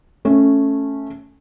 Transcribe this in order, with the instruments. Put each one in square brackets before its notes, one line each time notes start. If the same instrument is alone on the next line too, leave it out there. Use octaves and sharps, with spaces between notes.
[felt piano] A3 C#4